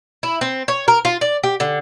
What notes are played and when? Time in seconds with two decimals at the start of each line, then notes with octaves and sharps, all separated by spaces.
0.23 E4
0.41 C4
0.68 C#5
0.88 A#4
1.05 F4
1.21 D5
1.43 G4
1.60 D3